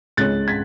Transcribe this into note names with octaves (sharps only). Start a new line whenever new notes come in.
C#2 C#3 G#3 C#4 F#6 A6
G#6 B6